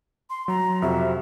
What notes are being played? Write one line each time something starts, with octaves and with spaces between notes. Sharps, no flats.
C6
F#3 A#5
F2 C3 F#4 E5